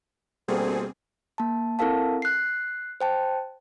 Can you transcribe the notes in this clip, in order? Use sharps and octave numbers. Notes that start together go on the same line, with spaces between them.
D2 B2 G3 A#3 C4 G#4
A#3 A5
C4 E4 A4 A#4 F5 A5
F#6 C7
C5 G5 A5